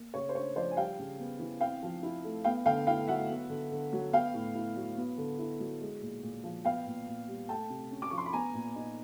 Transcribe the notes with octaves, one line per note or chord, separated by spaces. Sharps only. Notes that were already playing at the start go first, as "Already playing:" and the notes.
Already playing: A#3
C#3 C#5
C5
D4 C#5
F3 C5 D5
G#5
G3 F5 G5
C#3
B3
E3
C4 F5 G5
F3
E4
A3
B3 F5 G5
D3 F5 G5
E4 F5 G5
F#3 E5 F#5
B3
D3
D3
F#3
B3 F5 G5
A2
E4
F#3
B3
D3
E4
F#3
G#3
A#2
A#2
F3
B3 F5 G5
A#2
A#2
G3
A3 G5 A5
C3
C#4
D6
F3 C#6
C6
B5
B3 G#5 A#5
A#2
D#4